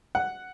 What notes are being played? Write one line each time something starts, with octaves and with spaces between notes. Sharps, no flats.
F#5